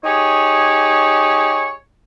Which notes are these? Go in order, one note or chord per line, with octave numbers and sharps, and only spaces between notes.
D#4 G4 G#4 C#5